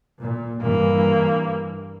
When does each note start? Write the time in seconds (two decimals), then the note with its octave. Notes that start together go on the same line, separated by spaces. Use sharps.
0.20 A#2
0.62 G2 E3 A#3